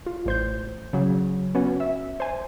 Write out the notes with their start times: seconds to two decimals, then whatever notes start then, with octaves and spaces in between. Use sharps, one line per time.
0.06 F4
0.26 A1 C5 G6
0.93 C#3 F#3
1.55 B3 C#4 F#4
1.80 E5
2.20 C5 G#5